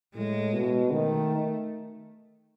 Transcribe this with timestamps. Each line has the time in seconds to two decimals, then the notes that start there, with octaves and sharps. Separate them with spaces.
0.14 A2 G#3
0.53 B2
0.92 D#3 A3